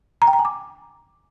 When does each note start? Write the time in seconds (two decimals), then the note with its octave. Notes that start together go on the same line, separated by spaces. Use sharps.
0.22 A#5
0.27 G5
0.33 A#5
0.39 G#5
0.45 D6